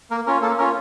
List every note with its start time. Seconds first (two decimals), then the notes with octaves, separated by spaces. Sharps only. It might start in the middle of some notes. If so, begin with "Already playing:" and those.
0.11 A#3 A#4
0.26 C#4 F4 A#4
0.42 A#3 A4
0.58 C#4 F4 A#4